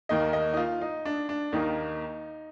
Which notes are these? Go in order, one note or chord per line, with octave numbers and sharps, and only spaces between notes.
D#2 D#3 A#3 D#5
D#5
D#4
F4
D#4
D4
D4
D#2 D#3 A#3 D#4